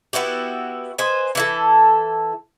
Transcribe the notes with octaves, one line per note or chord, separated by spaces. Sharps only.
B3 E4 F#4 G4
B4 C5 D#5 G#5
E3 E4 A4